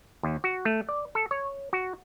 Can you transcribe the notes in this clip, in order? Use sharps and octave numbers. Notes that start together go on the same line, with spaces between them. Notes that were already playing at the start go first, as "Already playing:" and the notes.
D#2
F#4
A3
D5
A4
C#5
F#4